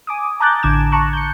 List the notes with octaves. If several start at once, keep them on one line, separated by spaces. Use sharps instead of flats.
G#5 D6 D#6
A5 A#5 D6 F#6 G6 A6
A1 D3 D6 G#6 E7
A5 A#5 C#6 F#6
G6 C#7